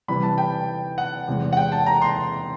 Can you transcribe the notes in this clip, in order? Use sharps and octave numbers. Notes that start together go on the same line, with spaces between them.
C3 E3 G3 B5
A5
G5
F#5
E2 C3 E3 G#3
F#5
G5
A5
A#5
C6